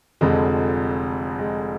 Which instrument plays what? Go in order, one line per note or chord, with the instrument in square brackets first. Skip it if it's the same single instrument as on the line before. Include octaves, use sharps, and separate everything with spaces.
[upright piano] F1 F2 D3 G#3
G#3